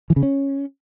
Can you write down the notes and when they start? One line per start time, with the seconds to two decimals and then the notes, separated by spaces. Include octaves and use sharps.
0.10 E3
0.16 C#3
0.23 C#4